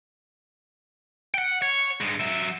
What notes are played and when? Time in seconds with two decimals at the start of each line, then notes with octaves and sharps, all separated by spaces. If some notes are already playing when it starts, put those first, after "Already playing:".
1.34 F#5 G5
1.62 C#5
2.01 G2 G#3
2.20 F#3 E5